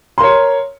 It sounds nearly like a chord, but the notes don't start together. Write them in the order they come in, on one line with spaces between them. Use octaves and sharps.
C6 A#4 C#5